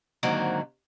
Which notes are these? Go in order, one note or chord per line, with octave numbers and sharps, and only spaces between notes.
G#2 D3 D#3 F#3 A#3 C4